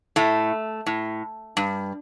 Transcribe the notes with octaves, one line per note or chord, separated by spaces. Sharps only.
A2 A3
A2
G2